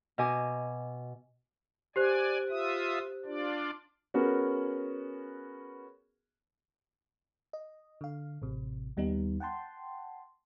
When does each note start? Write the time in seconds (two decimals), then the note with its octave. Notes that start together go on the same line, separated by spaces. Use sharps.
0.18 B2 D#5 G#5 D6
1.96 G4 C5 D5 G#5 F#6
2.50 F4 E5 D#6
3.25 D4 F4 D5
4.14 B3 C#4 F#4 G#4 A#4
7.53 D#5
8.01 D3 F5
8.42 A1 C3
8.97 D#2 G3 B3 D#4
9.40 F#5 G5 A5 C6